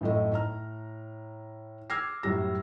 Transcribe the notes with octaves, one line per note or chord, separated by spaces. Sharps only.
A1 F#2 A2 A3 D#5
A2 A#5 F6
D6 E6 F6 G#6 A#6 C7
F#2 A2 G3 A#6